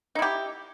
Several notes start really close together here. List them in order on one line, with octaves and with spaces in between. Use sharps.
D#4 E4 G4